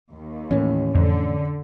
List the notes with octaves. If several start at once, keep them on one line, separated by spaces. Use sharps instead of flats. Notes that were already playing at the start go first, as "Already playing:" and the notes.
D#2
A2 E3 C#4
F2 D3